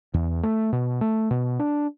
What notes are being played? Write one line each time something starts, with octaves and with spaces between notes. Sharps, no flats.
E2
A3
B2
A3
B2
D4